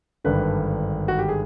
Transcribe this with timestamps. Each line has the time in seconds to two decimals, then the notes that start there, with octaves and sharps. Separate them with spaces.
0.24 G#1 G2 D3 B4
1.08 F#4
1.19 G4
1.29 G#4